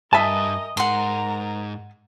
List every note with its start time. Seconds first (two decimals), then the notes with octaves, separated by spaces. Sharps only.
0.13 G2 A#4 D#5 E5 G#5 A5
0.77 G#2 A#4 F#5 A#5 C6